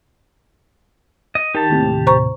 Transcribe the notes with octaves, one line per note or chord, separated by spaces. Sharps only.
D#5
D#3 G4 A5
D#2 A2 C3
C5 A#5 C#6